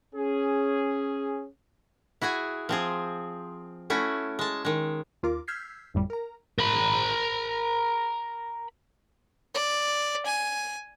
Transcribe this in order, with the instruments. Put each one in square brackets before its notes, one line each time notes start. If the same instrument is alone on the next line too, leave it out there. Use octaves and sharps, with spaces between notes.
[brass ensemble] C#4 G#4
[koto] E4 F#4 G#4 G#5
F3 C4 G#4
A3 C#4 E4 F#4
G#3 A5
D#3 G#3
[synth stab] D#2 F4 A#4 D6
E6 F6 G6 G#6 B6 C7
G1 F2 A2 G3
A#4 A#5
[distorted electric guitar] A#4 B5
[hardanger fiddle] D5
G#5